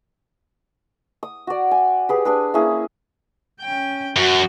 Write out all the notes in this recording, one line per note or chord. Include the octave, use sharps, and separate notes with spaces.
D#6
F#4 D5
G#5
G4 G#4 B4
D4 G#4 B4
A#3 C#4 E4 G#4
C#4 G5
F#2 F#4